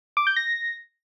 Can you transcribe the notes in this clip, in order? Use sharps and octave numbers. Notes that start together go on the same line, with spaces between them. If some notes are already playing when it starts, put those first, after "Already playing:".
D6
G6
A#6